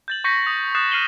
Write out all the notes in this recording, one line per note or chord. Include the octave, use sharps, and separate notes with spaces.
G6 A6 F#7
C#6 G6 A#6 B6 C#7
D#6
D#6 F#6 A6 C7 E7
F6 C7 D#7 F#7 G7